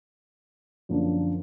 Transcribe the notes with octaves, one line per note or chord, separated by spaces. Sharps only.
F#2 D3 F3 A#3 D4